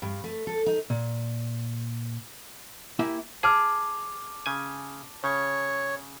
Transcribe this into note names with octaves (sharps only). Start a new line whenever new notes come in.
G2
A3
A4
D#4
A#2
A#3 E4 G4 E5 G#5
G#4 A5 D6 F6
C#3 G#5
C#3 C#5